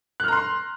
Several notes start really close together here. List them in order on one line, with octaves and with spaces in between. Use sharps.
F#6 F6 A#5 C6